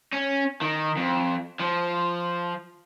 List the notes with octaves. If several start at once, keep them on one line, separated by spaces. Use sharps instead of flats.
C#4
D#3
F2
F3